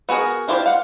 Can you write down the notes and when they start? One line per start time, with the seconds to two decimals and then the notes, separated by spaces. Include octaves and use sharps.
0.09 B3 F#4 G#4 A#4
0.48 D4 E4 F4 G4 C5
0.66 F5 F#5